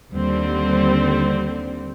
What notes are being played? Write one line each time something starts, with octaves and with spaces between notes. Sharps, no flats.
D#2 D3 G3 C4